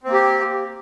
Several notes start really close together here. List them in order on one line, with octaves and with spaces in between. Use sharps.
C4 A#3 G4